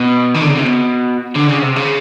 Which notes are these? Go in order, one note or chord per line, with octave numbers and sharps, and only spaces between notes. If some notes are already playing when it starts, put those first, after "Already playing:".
Already playing: B2
D#3
D3
C#3
C3
B2
D3
C#3
C3
C#3